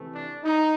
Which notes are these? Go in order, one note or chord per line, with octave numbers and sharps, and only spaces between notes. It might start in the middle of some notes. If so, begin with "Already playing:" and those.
Already playing: C3 E3 A3
D4
D#4